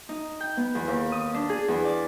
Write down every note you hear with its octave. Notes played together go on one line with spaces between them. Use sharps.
D#4
G5
B3
E2
D#2
D#6
D4
G#4
E2
D5